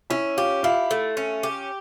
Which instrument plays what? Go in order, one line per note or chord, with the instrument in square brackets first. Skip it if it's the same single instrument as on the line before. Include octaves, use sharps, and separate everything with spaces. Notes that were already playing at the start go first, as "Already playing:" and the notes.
[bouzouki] C#4 [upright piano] E4 E5
[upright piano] F4 F5 [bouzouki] G4
[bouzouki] E4 [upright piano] F4 F5
[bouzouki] A3
C#4
G4